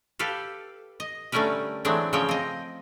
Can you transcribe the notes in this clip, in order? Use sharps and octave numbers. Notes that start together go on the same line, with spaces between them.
G4 A4 B4 F5
D#5
D3 G3 A3 C#4 A#4 B4
E3 F#3 G#3 A3 C4 D4
C#3 F3 C4 C#5 G5
C4 D#5